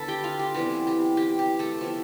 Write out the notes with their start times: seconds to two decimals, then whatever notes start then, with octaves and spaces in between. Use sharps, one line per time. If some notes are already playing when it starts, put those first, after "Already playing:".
Already playing: D3 B3 A4 B4 A5 B5
0.08 G4 G5
0.24 F4 F5
0.39 G4
0.54 C3 E3 G3 B3 G4
0.87 G4
1.17 G4
1.39 G4
1.59 A3 A4
1.81 F3 B3 E4